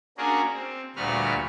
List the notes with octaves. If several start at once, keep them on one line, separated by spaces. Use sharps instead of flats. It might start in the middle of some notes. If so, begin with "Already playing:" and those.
A#3 C#4 D4 F#4 G#4 A#4
C4
D2 A#2 G3 F#4 B4 F6